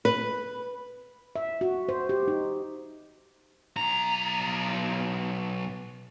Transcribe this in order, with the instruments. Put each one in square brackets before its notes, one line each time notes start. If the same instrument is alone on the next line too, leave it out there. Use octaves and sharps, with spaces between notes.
[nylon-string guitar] B4
[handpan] E5
F#4
C5
G4
D#4
[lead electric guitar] B1 A#5